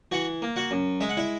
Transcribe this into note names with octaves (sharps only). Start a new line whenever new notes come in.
E3 F#4 F#5
A#3
F#4 F#5
F#2
G#3 E5
F#5
E4 E5